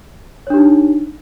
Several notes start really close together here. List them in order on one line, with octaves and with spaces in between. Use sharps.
C#5 D4 G4 D#4